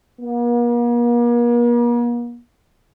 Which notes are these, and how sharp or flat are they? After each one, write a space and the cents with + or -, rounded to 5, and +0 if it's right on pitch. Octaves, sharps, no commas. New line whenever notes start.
A#3 +45